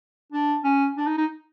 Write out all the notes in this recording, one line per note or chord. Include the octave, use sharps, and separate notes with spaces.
D4
C#4
D4
D#4
D#4